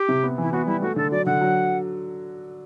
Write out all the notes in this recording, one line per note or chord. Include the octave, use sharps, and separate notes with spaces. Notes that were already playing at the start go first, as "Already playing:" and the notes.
Already playing: G4
C3
B3
E3 E4
B3 F#4
G3 E4
A3 F#4
D3 A4
F#3 D5
D3 F#5
F#3